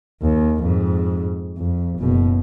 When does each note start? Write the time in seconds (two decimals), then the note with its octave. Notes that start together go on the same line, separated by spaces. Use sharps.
0.23 D#2
0.62 F2 G#2
1.58 F2
1.99 F#1 B2